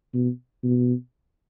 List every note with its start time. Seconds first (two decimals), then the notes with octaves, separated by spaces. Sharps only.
0.14 B2
0.64 B2